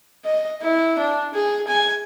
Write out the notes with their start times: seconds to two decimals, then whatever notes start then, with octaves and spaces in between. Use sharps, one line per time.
0.25 D#5
0.62 E4
0.98 D4
1.34 G#4
1.68 G#5